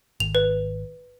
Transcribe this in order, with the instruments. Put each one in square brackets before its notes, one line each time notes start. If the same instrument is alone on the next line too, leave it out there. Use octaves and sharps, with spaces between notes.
[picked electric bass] G#1 [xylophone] F7
[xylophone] B4